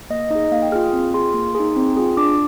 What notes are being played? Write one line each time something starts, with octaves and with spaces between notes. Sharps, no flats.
A#3 D#5
D#4 G#4 D#5
A#3 F5
G5
F4 G#4 F6
D#6
C4
F4 G#4 C6
A#3
D#4 G#4
C4
F4 G#4
D4 D6